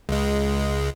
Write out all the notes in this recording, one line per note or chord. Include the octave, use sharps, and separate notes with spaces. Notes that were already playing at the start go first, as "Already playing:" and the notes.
C#2 G#3